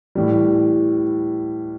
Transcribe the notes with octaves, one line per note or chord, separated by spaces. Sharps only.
A2 E3 G3